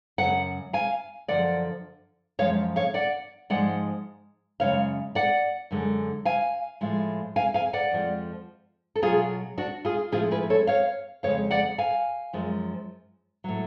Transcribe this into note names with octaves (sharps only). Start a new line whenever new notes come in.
F#2 C#3 F#3 F#5
F5 G#5
F#2 D3 F3 D5 F#5
F#2 F3 G#3 C#5 F5
C#5 F5
D5 F#5
G#2 F3 G#3 D5 F#5
F#2 C#3 G#3 C#5 F5
D5 F#5
F#2 D3 G#3
F5 G#5
A2 F3 G#3
F5 G#5
F5 G#5
D5 F#5
F2 F3 G#3
A4
B2 F#3 F4 G#4
D4 F#4
F4 G#4
A2 F3 G#3 F4 G#4
G#4 B4
A4 C#5
C#5 F5
F2 C#3 G#3 C#5 F5
D5 F#5
F5 G#5
F#2 F3 G#3
A2 F#3